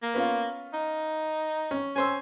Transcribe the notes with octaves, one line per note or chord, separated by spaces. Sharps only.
A#3
B3 C#4 F4
D#4
C#4
C#4 C5 G#5 E6